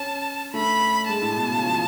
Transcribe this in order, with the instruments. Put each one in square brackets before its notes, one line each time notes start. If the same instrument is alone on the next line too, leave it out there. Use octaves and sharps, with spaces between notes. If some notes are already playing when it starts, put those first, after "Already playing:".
Already playing: [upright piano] C#4 [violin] A5
[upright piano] A3 [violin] B5
[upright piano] G#3 [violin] A5
[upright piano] A2
B2
C#3
F3